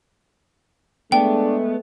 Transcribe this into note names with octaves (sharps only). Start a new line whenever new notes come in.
G#3 A3 B3 D4 G5